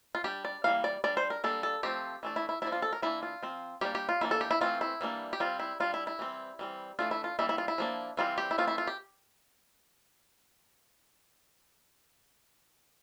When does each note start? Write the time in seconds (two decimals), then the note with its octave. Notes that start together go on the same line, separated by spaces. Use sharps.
0.15 F4
0.24 G3 D4 G4
0.45 D5
0.64 E3 G3 A#3 F5
0.84 D5
1.04 G3 D4 D5
1.17 C5
1.30 A#4
1.44 G3 A#3 D4 A4
1.63 A4
1.83 F3 A3 C4 G4
2.23 E3 A3 D4
2.36 E4
2.49 E4
2.62 F3 A#3 D4 E4
2.72 F4
2.82 A4
2.93 A#4
3.02 E3 A#3 D4 E4
3.23 F4
3.43 F3 C4
3.81 G3 A#3 D4 G4
3.95 G4
4.09 F4
4.21 E3 A#3 D4 E4
4.31 A4
4.41 G4
4.51 E4
4.61 E3 A3 C4 F4
4.81 E4
5.01 E3 G3 A#3 D4
5.33 G4
5.40 G3 C4 F4
5.59 E4
5.80 G3 D4 F4
5.94 E4
6.07 E4
6.19 E3 G3 C4
6.59 E3 G3 C4
6.99 E3 A3 D4 F4
7.11 E4
7.24 F4
7.39 E3 G3 A#3 D4 E4
7.49 E4
7.58 F4
7.68 E4
7.78 F3 A#3 D4
8.17 E3 G3 C4 F4
8.38 G4
8.51 E4
8.58 E3 A3 C4 F4
8.67 E4
8.78 F4
8.87 G4